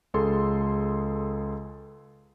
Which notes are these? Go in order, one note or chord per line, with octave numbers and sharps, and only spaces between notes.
C#2 G#4 A4 C6